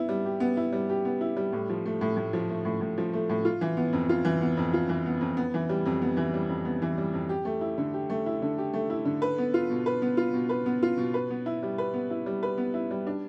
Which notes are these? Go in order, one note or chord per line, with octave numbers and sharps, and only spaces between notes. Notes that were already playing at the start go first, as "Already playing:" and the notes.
Already playing: B3 E4
G3
G4
B3
E4
G3
G4
B3
E4
G3
A2
F3
A3
A2
A2
F3
A3
A2
A2
F3
A3
A2
F4
E3
B3
F2
F4
E3
B3
F2
F4
E3
B3
F2
B3
E3
G3
F2
B3
E3
G3
F2
B3
E3
G3
F2
G4
A3
E4
D3
G4
A3
E4
D3
G4
A3
E4
D3
B4
B3
F4
B2
B4
B3
F4
B2
B4
B3
F4
B2
B4
B3
E4
G3
B4
B3
E4
G3
B4
B3
E4
G3
D4